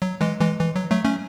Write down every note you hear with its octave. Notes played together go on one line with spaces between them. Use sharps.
F#3
E3 G#3
E3 G#3
E3
F#3
F#3 A3
A3 C#4